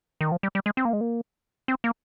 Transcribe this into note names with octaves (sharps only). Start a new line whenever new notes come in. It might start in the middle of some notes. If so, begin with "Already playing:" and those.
D#3
F3
G3
G3
G#3
C4
A#3
G#3
A#3
C4
A#3